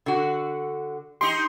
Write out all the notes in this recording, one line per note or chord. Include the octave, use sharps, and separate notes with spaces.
D3 F#4
D#4 G4 C6